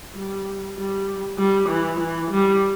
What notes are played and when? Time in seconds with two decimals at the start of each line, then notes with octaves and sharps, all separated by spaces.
0.15 G3
0.77 G3
1.38 G3
1.69 E3
2.00 E3
2.30 G3